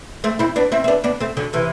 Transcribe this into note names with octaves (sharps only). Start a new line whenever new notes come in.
A3 C4
C4 E4
B3 D4
C4 E4
C4
B3 D4
B3 D4
A3 C4
D3 F#3
C3 E3